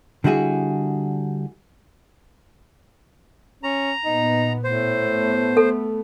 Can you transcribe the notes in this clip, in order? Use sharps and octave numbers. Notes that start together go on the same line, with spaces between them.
D3 G3 E4 F#4 G#4
C#4 A#5
A#2 B3 D#4
A2 C5
A3 B3
A4